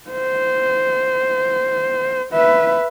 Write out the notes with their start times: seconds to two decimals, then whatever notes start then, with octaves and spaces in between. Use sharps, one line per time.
0.11 C5
2.33 B4 E5